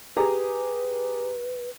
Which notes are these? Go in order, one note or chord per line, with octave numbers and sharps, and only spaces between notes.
G4 G#4 B4 A#5